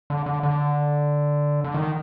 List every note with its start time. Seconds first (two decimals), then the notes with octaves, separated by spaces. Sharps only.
0.10 D3
0.26 D3
0.43 D3
1.64 D3
1.74 D#3